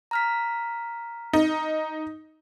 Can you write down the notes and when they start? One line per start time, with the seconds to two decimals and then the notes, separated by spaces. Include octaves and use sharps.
0.11 A#5 F6 B6
1.33 D#4